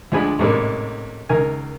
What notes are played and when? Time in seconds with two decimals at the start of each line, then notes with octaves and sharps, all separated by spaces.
0.12 D2 F3 G#3 D4 G#5 B5
0.39 A1 G#2 C3 G3 G#3 A#3
1.29 C#2 D#3 A#4 G#5